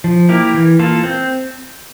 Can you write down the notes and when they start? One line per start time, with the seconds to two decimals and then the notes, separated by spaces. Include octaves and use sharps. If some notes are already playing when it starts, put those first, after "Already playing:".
0.04 F3
0.29 A#3 E4 G4 A#4
0.54 E3
0.79 A#3 F4 A4
1.04 C4